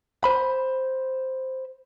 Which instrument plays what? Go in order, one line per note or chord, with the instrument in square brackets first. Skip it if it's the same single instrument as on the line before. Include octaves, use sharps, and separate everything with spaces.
[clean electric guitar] C5 B5